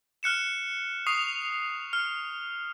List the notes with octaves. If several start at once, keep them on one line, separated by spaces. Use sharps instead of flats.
F6 F#6 C#7 E7
C#6 D#6 C7 F7
F6